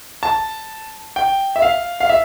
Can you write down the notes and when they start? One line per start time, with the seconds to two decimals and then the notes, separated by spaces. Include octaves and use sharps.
0.23 A5
1.16 G5
1.56 E5
1.62 F5
2.00 F5
2.09 E5